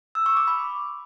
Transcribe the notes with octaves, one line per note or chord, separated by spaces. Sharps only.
E6
C#6
D6
B5